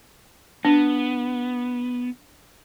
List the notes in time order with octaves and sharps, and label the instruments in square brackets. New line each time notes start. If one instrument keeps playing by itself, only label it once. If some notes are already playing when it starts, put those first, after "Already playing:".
[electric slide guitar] B3 [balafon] D4